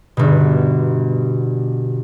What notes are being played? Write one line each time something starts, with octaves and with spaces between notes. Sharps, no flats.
G1 B2